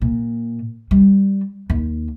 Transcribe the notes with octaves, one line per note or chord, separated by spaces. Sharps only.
A#2
G3
D#2